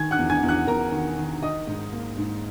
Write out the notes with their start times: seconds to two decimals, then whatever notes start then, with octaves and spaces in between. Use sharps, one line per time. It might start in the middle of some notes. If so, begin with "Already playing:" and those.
Already playing: D#3 G#5 G#6
0.11 F#5 F#6
0.18 E2
0.30 G#5 G#6
0.43 E2
0.48 F#5 F#6
0.67 E2 A#4 A#5
0.92 D#3
1.18 D#3
1.42 D#3 D#5 D#6
1.67 G#2
1.93 A#3
2.18 G#2